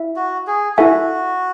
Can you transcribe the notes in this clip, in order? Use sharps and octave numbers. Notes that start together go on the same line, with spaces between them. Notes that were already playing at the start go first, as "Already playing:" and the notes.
Already playing: E4 E5
F#4
G#4
E4 F#4 A4 E5 G#5